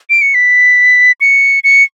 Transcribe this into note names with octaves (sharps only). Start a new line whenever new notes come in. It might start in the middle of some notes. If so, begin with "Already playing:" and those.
D7
C#7
B6
C#7
C#7